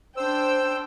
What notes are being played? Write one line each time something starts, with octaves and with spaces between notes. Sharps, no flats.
D4 C5 G5 E6